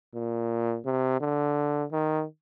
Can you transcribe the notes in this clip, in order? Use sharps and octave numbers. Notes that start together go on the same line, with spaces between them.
A#2
C3
D3
D#3